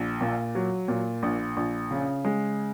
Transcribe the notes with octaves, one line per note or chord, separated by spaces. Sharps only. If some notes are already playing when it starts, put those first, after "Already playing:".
Already playing: A#1
A#2
F#3
A#2
A#1
A#1
C#3
G#3